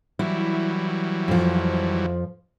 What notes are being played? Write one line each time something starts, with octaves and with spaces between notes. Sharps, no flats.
E3 F#3 G3 E4
F2 F3